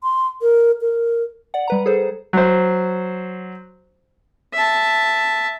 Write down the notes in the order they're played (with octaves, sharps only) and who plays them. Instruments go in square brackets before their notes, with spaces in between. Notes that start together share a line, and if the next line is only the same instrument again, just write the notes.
[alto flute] C6
A#4
A#4
[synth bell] D5 F#5
G3 B4 A#5
G#4 A4 C5
[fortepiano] F#3 C5
[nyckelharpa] E5 A5